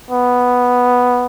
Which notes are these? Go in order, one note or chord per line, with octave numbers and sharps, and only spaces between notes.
B3